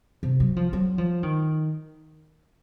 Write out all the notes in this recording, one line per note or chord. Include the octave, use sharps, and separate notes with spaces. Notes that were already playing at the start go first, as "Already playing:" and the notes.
C3
F#3
F3
F#3
F3
D#3